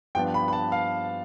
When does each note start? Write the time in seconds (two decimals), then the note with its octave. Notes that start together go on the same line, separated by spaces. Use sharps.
0.15 G2 F3 B3 D4 G5
0.34 B5
0.48 B5
0.53 A5
0.72 F5